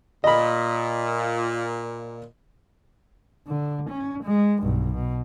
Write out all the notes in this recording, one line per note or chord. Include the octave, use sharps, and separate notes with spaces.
A#2 D#5 B5
D3
C#4
G#3
B1 G2
B2